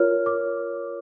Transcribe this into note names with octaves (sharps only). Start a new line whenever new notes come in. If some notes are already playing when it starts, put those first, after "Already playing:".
Already playing: F4 A#4 C#5 F6
D6